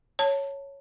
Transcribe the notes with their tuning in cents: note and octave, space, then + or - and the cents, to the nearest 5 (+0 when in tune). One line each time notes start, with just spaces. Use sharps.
C#5 +0 A5 +15